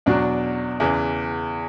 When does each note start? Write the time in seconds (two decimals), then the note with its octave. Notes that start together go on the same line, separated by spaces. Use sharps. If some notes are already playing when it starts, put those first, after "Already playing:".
0.06 E2 B2 F#3 D4
0.80 E2 C#3 E3